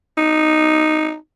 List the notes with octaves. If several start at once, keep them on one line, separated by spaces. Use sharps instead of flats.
D#4